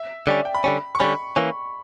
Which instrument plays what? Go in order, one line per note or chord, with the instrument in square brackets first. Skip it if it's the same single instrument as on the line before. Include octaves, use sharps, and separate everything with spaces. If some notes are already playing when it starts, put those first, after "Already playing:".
Already playing: [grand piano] E5
[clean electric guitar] D3 G3 C#4 [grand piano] D5
[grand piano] G5
B5
[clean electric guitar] D3 G3 C#4
[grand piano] C#6
[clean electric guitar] D3 G3 C#4 [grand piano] B5
[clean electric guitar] E3 A#3 C#4